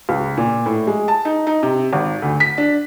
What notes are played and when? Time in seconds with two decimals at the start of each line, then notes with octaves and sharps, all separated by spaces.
0.09 C#2
0.37 A#2
0.66 A2
0.87 G#3
1.08 A5
1.25 D#4
1.47 D#4
1.63 C3
1.93 G#1
2.22 D2
2.40 B6
2.58 D4